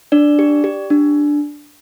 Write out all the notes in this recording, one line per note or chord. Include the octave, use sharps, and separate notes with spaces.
D4 D5
G4
G4
D4